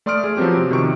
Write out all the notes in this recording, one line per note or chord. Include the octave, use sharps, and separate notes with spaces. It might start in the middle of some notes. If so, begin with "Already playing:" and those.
A3 D5 C6 D#6 F6 D7
G#4
F3 F#3 B3 C4 G4
C3
C3 D#3 C#6 D7